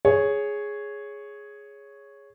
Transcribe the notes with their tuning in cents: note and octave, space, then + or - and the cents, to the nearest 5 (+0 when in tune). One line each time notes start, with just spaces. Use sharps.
G#4 +0 C#5 +0